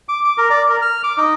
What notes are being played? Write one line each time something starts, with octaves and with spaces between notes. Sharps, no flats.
D6
D6
A#4
D5
A#4
F6
D6
D#4